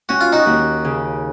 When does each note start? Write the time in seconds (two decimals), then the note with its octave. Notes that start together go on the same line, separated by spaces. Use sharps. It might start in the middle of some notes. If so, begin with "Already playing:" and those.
0.09 C#4 F#4
0.21 F4
0.33 D#4 F#4
0.46 D#2
0.85 C#3